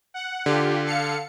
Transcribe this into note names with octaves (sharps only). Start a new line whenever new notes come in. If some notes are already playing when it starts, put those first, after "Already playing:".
F#5
D3 F4 G4
A4 F5 C#7